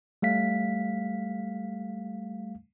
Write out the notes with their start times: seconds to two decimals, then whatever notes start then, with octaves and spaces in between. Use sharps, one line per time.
0.22 G3 A3 F5 B6